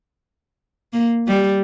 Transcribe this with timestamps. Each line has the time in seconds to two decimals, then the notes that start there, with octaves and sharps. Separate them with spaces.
0.93 A#3
1.28 G3